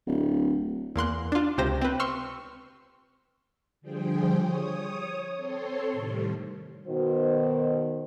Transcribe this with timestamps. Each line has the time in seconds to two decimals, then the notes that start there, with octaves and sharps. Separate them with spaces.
0.07 D1
0.96 E2 A#3 C6 F#6
1.32 D4 F4
1.58 C#2 C3 G4 C5 A#6
1.82 C4 B4
2.00 C6 C#6 E6 F6
3.81 D3 F3 G3 G#4 C5 G5
4.37 C#5 D#6
5.35 C4 A4 C#5 C6
5.92 A2 C3 D#3 G3
6.87 B2 D#3 F#4 C5